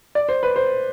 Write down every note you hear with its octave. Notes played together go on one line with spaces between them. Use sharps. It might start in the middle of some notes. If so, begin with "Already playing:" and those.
D5
C5
B4
C5